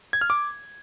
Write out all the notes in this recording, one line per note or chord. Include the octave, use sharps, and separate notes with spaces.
G#6
F6
D6